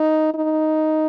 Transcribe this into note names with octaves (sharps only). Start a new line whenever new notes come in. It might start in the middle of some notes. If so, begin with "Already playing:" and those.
Already playing: D#4
D#4